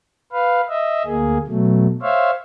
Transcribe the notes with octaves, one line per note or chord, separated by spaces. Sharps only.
B4 F5
D#5 E5
D2 A#3 G#4
B2 F#3 A3
C5 C#5 E5 F5